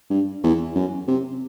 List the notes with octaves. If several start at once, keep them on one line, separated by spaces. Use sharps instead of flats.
G2
E2
F#2
C3